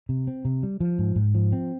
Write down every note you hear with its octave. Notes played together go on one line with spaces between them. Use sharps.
C3
C4
C3
G3
F3
G#2
G#2
F3
C4